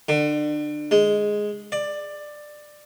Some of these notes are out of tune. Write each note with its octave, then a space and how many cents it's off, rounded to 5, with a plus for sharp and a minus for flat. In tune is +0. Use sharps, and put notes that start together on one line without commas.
D3 +30
G#3 +0
D5 +15